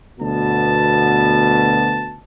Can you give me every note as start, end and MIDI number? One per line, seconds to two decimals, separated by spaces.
0.20 2.21 38
0.20 2.21 47
0.20 2.21 59
0.20 2.21 81